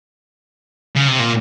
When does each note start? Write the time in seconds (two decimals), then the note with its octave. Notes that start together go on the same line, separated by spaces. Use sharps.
0.96 C#3
1.08 C3
1.19 A#2